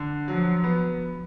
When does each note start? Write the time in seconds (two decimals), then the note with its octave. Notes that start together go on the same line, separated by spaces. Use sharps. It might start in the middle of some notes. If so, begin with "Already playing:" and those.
Already playing: D3
0.28 F3 F#3
0.64 B3